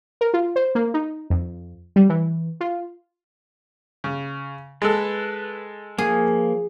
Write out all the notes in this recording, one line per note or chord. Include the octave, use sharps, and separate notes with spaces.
A#4
F4
C5
A#3
D#4
F2
G3
E3
F4
C#3
G#3 A4 B4
F3 A#3 G#4